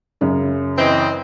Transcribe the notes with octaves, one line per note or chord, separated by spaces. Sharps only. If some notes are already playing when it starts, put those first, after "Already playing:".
F#2 C#3
E3 C4 D#5